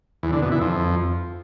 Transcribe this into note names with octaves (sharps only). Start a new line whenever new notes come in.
E2
D3
B2
E3
F2